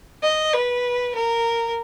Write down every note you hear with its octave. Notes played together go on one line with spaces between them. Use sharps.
D#5
B4
A#4